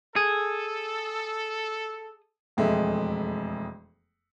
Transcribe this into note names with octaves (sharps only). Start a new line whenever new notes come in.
G#4 A4
E1 F2 G#3 A3 E5